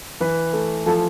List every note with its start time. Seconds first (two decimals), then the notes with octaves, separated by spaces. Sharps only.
0.20 E3 B4
0.53 A3
0.86 F3 A4